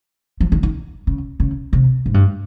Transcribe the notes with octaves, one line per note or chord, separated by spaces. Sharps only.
F3
D#3
D#3
C#3
C#3
C3
G#2
G2